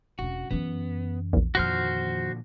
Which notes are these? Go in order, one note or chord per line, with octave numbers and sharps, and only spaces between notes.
E1 C#4 F#4
F#2 E3 B3
A#1 E2
F2 A#2 D3 D#3 F3 F#4 C5 F6